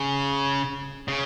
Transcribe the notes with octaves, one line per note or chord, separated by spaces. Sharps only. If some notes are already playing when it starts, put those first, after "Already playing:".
Already playing: C#3
C#3